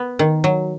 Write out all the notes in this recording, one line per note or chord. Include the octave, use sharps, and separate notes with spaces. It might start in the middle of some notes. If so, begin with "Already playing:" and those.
Already playing: B3
D#3
F#3